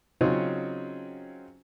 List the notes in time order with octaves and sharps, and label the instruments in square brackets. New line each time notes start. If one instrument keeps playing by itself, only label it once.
[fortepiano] C#3 F#3 C4 C#4 D#4 F4